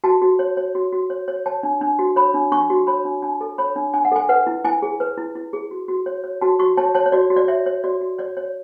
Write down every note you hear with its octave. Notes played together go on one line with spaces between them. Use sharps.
F#4 A5
F#4
C#5
C#5
F#4
F#4
C#5
C#5
C#5 A5
D4
D4
F#4
C#5 B5
D4
D4 C#6
F#4
C#5 B5
D4
D4 A5
A4
C#5 B5
D4
D4 G#5
F#5
A4 G#5
B4 F#5
E4
E4 G#5
G#4
B4
E4
E4
G#4
F#4
F#4
C#5
C#5
F#4 A5
F#4 C#6
C#5 A5
C#5 A5
C#5
F#4 D5
F#4
D5
C#5 E5
C#5
F#4 D5
F#4
C#5 D5
C#5